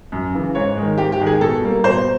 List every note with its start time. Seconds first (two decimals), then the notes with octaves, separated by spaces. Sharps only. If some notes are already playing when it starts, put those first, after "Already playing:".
0.12 F#2
0.33 C#3 E3
0.55 G#2 C#5
0.77 D#3 G#3
0.98 G#2 G4
1.12 G4
1.19 D#3 G#3
1.27 G#4
1.41 B2 A4
1.62 G3 A#3
1.84 B2 C5